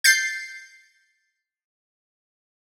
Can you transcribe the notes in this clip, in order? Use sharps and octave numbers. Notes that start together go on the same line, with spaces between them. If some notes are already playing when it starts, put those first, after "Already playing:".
G6 A6 C7